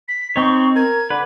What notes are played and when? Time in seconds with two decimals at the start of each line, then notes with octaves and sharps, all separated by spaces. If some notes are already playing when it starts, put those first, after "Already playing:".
0.08 B6
0.36 C4 D#4 C#5 C#6
0.76 A#4 G#6
1.10 D3 B4